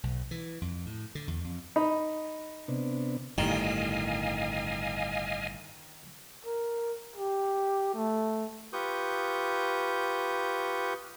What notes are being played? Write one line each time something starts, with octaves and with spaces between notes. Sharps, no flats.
B1
E3
F2
A2
D3
E2
F2
D#4 B5
C3 B3 D4
G1 A2 D#3 G3 D#5 F5 G#5
A#4
G4
A3
F4 G4 B4 C#6 D#6 G6